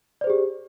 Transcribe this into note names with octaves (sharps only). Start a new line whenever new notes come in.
G4 G#4 C5 D5